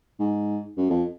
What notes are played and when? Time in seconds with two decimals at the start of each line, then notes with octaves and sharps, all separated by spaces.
0.19 G#2
0.77 F#2
0.90 F2